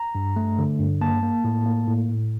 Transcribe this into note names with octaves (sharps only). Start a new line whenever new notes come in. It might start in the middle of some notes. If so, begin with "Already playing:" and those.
Already playing: A#5
G2
A3
D3
G2
A#3 A5
A#3
A2
A#3
A2
A2